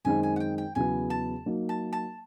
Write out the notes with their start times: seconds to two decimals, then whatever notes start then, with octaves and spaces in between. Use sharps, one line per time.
0.05 F#2 D#3 G#3 C4 D#4 G#5
0.23 G#5
0.36 F#5
0.40 G5
0.58 G5
0.75 E2 C#3 F#3 B3 E4 G#5
1.10 A5
1.46 F#3 A#3 D#4
1.69 A5
1.93 A5